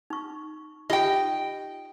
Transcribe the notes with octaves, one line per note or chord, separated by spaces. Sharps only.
D#4 C#6
D#4 F4 G4 D#5 G5